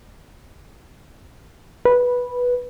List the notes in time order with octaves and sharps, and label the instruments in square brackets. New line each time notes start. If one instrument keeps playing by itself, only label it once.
[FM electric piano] B4